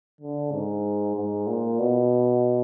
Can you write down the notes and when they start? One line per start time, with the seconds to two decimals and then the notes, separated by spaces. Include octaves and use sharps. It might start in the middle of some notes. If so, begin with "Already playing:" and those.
0.21 D3
0.52 G#2
1.16 G#2
1.47 A#2
1.79 B2